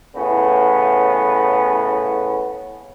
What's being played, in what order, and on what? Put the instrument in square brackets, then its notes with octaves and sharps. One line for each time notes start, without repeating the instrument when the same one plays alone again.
[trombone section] A2 C#3 B3